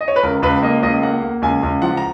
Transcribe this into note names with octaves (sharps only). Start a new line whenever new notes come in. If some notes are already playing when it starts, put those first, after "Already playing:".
D#5
C#5
B4
C#2 A#4
C#2 B4
A#3 D#5
C#2 D#5
A#3 F#5
A#3
C#2 G#5
C#2
F3 F#5
A#5